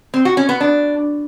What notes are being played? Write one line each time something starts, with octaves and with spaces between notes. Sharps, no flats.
C4
F#4
C#4
B3
D4